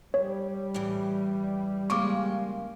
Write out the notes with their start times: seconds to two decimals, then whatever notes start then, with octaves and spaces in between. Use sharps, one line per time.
0.14 G3 C#5
0.74 A2 E3
1.90 C#3 G#3 A#3 C#6 D6